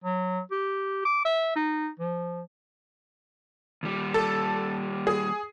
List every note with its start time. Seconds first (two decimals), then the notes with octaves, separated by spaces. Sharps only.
0.04 F#3
0.51 G4
1.05 D6
1.25 E5
1.56 D#4
2.00 F3
3.83 D#2 G3
4.14 A4
5.07 G#4